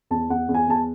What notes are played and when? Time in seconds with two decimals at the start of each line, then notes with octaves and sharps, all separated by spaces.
0.11 E2 A5
0.30 E2 F#5
0.49 E2
0.54 G#5
0.68 E2 A5